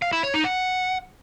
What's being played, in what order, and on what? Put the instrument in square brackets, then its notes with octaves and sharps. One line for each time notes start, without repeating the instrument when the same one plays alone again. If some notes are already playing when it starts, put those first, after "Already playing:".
[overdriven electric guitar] F5
E4
C#5
D#4
F#5